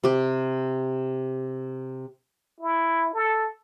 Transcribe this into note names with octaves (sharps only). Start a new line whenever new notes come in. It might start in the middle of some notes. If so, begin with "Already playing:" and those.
C3 G4
E4
A4